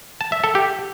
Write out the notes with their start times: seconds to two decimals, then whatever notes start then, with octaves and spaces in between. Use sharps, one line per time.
0.21 A5
0.32 E5
0.44 A4
0.55 G4